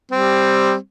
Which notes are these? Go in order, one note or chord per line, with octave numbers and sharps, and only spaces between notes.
G3 C4